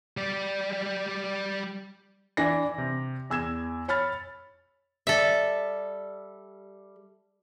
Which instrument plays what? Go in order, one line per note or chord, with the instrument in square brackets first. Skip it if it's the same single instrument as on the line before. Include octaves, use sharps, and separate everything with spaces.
[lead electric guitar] G3 D5
[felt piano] E3 D4 A#6
C3
E2 E6 G#6 E7
C#5 B5 F6 A6
[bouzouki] G3 [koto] A4 E5